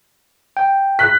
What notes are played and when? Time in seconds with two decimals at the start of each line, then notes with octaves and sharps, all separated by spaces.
0.57 G5
0.99 F#6 B6